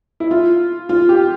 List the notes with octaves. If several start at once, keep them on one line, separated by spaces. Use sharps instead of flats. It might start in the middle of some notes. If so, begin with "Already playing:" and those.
E4
F4
F4
G4